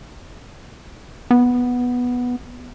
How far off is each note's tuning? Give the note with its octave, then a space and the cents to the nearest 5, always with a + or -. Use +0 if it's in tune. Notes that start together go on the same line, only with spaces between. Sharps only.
B3 -5